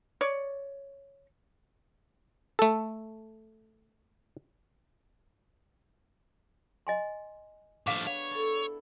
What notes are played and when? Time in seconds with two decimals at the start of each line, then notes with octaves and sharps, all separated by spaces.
0.21 C#5 D5
2.59 A3 A4
6.87 D#5 G#5 C6
7.87 A2 F3 D4 F5 D6
8.07 B3 G#4 C#5 F5
8.31 E4 A4